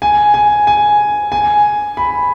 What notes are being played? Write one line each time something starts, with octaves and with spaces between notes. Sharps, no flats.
G#5
G#5
G#5
G#5
B5